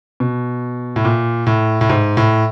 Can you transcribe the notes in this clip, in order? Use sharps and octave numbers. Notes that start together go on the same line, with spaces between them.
B2
A2
A#2
A2
A2
G#2
A2